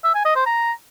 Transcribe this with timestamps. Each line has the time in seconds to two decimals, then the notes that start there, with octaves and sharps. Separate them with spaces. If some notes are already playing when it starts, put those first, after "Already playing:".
0.04 E5
0.15 G#5
0.25 D#5
0.36 C5
0.46 A#5